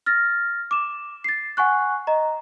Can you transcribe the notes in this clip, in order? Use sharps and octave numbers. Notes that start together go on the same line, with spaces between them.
F6 A6 A#6
D6 E7
A6 C7
F#5 G#5 C#6 F#6
D#5 A#5